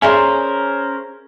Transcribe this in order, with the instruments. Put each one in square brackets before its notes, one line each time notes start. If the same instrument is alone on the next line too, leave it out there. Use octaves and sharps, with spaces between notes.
[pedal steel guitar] C#4 A#4 C5 [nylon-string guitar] G#4 D5 E5 [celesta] G#5